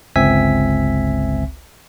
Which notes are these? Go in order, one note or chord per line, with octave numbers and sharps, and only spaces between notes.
G1 C#2 C4 E5 G#5 B6